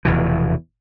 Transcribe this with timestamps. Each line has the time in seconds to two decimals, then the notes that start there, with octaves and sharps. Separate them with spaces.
0.05 F1 E2 B2 E3